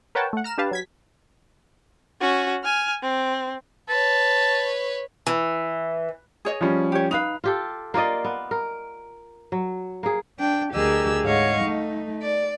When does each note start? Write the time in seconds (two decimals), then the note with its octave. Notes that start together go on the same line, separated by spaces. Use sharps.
0.15 A#4 B4 C#5 F#5 G5 A5
0.33 A3 F#5
0.44 A#5 F6 E7
0.58 D4 G4 B4 F5 A5
0.71 F#3 G#6 B6
2.21 C#4 F#4
2.64 G#5 F6
3.02 C4
3.89 B4 C#5 A5
5.27 E3
6.45 G#4 C#5 D#5
6.61 F3 G3 C#4
6.92 G4 C#5
7.11 D#4 B4 F5 F7
7.44 F4 G4 A4
7.94 A#3 F4 D5 D#5
8.24 B3
8.51 A#4
9.52 F#3
10.03 A#3 G#4
10.38 D4 G5
10.74 D2 G4 G#4 A#4 D#5 E6
11.24 G#2 C#5 D#5 F5 F#5 C#6
11.62 A3 D#4
12.22 D5